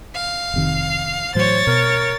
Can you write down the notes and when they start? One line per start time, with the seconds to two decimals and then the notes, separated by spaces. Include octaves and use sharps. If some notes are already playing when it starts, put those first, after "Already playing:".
0.15 F5
0.54 F1 C3 D#3
1.35 A2 E3 F#3 C5 C#5 A6
1.67 B2 A#4